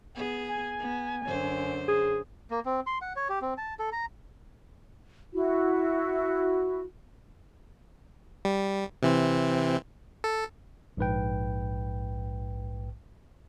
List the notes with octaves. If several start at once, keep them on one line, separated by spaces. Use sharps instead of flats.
B3 G#4
G#5
B3
F#2 D3 C5
G#4
A#3
C4
C6
F#5
C#5
G4
C4
A5
A4
A#5
E4 F#4
G3
C3 E3 C4
A4
A#1 G#2 B4 G5